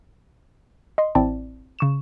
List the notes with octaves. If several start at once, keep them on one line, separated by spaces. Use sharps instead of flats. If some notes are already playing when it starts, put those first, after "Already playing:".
D#5 C6
A1 C4 E4 D5 A5
C#3 C#6 E7